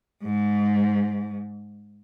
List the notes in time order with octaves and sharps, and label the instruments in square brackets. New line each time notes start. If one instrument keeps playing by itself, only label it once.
[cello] G#2